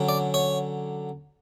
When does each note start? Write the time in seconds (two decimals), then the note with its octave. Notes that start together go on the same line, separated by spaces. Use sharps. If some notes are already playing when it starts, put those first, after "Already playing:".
Already playing: D3 F#3 C#4
0.09 D5
0.34 C#5